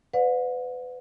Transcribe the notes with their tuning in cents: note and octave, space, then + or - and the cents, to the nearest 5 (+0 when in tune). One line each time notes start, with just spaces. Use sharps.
B4 +30 D5 +0 F#5 -45